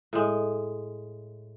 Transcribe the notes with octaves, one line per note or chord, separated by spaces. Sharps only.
A2 G#3